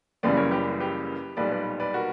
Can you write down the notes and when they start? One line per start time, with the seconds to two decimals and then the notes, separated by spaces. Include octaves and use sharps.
0.23 F#1 F#2 C#3 E3 G3 B4 D5
0.37 A#4 C#5
0.51 G4 B4
0.80 G4 B4
1.37 B1 A#2 G3 B4 D5
1.51 B4 D5
1.80 B4 D5
1.94 F#4 A#4